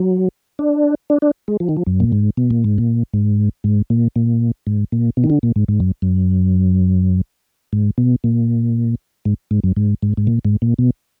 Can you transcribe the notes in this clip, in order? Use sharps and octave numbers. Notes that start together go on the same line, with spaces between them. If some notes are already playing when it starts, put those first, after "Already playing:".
Already playing: F#3
D4
D4
D4
G#3
F3
D#3
F3
F#2
A#2
G#2
B2
A#2
G#2
A#2
G#2
G#2
A#2
A#2
G#2
A#2
B2
D#3
D3
A#2
G#2
G#2
F#2
F#2
G#2
B2
A#2
G#2
G#2
F#2
G#2
G#2
G#2
A#2
G#2
A#2
B2